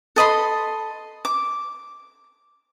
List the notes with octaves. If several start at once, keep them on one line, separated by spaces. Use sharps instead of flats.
A4 D#5 B5 C6
D6